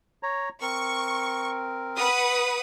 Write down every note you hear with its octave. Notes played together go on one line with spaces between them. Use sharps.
C#5 A#5
C4 A#4 C#6
B4 F#5 D#6